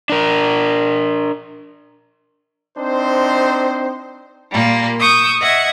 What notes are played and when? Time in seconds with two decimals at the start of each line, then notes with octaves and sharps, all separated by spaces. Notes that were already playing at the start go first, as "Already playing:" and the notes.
0.10 D4 A#4
2.78 C4 D4 D#4 C5
4.52 A#2 G3 A#3
5.00 C#6 D#6 E6 G6
5.40 D#5 E5 F#5 G#6